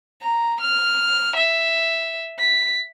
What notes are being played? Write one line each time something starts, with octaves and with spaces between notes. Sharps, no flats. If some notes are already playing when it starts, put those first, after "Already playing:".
A#5
F6
E5
B6